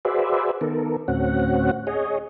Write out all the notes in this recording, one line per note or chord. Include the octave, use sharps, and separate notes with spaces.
F#4 G#4 B4 C5 D5 E5
D#3 B3 A4 A#4
D2 A2 C4 C#4 F#4 F#5
G#4 C#5 D#5